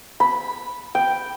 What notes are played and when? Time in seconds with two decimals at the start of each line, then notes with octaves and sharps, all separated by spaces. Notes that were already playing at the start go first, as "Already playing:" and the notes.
0.20 B5
0.95 G5